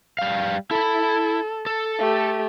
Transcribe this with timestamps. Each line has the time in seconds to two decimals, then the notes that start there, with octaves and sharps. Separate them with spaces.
0.19 G3 F5
0.71 E4 A4 B5
1.66 A4
1.99 A3 G4